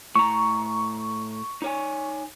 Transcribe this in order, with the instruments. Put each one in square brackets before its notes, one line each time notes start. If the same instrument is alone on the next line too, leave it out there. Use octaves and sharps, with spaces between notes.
[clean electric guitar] A2 A#5 [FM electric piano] C#6
[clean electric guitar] D#4 C#5 G#5